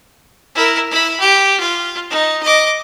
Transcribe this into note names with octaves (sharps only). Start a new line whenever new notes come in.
E4 A#4
E4 B5
G4
F4
D#4
D#5 D6